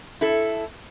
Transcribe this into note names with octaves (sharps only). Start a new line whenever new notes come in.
E4 A4